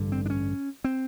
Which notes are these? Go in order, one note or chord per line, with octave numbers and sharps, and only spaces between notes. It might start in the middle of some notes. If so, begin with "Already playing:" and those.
Already playing: A1 G2 D3
C4
D4
C#4
C4